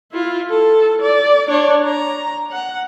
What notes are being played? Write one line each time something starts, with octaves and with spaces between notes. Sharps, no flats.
E4 F4
A4
D5
D4 C#5
A#5
F#5